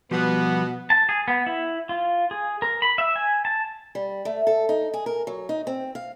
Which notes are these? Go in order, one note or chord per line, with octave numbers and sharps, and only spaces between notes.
B2 F3 G3 B3 G4
A5
G#4
B3
E4
F4
G#4
A#4
B5
E5
G#5
A5
G3
A3
A4
D#4
G#4
A#4
F#3
D#4
C4
F5